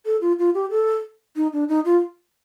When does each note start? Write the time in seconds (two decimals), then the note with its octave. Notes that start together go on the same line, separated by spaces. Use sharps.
0.06 A4
0.21 F4
0.39 F4
0.54 G4
0.71 A4
1.36 D#4
1.53 D4
1.69 D#4
1.85 F4